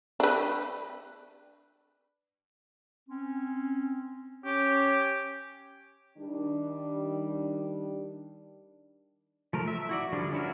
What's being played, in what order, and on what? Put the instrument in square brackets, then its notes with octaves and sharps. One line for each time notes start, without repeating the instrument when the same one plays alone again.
[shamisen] D4 B4
[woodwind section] C4 C#4
[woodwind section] C#4 C#5 [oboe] G4
[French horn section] D#3 G3 D4
[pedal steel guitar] F3 A3 A#4
E5
E4 F#4 D5
D3 F3 G3 D4
C#4 D4 E4 F#4 A#4